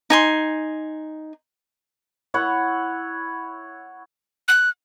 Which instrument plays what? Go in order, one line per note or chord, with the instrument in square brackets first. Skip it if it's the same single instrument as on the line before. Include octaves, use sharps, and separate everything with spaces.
[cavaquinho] D#4 G#5 C6
[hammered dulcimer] E4 C#5 F#5
[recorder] F#6